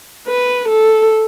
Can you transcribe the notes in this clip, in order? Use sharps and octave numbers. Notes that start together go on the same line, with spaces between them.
B4
A4